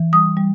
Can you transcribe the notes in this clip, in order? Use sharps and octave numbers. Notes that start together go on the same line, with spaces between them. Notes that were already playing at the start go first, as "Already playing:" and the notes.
Already playing: E3
G3 D#6
G3